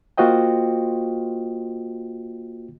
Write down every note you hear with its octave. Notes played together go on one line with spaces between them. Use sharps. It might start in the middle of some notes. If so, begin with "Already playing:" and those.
A#3 F4 F#4 C5 D#5 G5